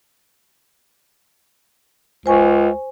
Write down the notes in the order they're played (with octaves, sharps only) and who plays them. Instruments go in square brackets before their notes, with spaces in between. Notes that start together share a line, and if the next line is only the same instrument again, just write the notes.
[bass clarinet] C#2 [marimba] C5 G#5 C#6